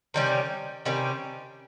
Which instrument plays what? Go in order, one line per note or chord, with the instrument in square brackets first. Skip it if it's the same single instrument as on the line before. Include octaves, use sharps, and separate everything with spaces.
[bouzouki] C3 D#3 G3 C#4
C3 D#3 G3 C#4